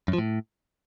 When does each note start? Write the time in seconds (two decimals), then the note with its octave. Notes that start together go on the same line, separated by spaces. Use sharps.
0.08 F#2
0.13 F3
0.18 A2